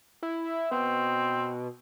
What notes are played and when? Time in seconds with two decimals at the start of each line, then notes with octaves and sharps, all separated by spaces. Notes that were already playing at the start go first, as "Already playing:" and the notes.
0.23 E4
0.71 B2 C4